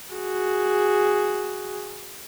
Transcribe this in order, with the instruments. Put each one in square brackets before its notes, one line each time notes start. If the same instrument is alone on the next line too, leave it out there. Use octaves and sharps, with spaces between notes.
[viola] F#4 G#4